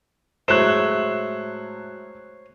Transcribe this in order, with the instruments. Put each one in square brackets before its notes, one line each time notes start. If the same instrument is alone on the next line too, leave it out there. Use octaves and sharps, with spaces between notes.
[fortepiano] A2 F#3 G#3 [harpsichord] C5 C#5 [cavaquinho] E5 [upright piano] F#6 E7